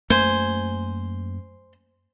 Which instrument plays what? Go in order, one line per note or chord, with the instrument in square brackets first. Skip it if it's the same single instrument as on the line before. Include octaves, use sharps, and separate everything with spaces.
[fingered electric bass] F#2 A3 A#3 [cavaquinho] C5 G#5